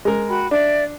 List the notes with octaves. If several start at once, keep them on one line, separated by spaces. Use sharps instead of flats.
G#3 A#4
F#4 G5 B5
D4 D5 E5